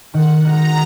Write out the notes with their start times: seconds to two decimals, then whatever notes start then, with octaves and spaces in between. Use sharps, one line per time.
0.13 D#3 F#5
0.45 G#3 D#4 F#4 A#4 A#5